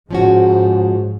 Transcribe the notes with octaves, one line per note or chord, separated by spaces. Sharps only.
G#2 F3 C#4 F#4